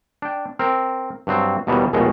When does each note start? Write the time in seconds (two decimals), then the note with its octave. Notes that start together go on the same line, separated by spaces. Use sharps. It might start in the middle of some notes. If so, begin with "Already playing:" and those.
0.22 D4 G5
0.59 C4 A#4
1.27 G2 F#3 C4
1.67 D#2 B2 D#3 E3 G3
1.93 A#1 D#2 B2 G#3 A3 C#5